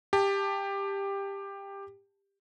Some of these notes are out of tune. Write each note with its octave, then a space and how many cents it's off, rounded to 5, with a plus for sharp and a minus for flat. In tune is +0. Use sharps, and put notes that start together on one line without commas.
G4 +15 A5 +0